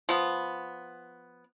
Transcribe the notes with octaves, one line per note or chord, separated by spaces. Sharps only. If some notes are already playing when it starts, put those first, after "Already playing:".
F3 B3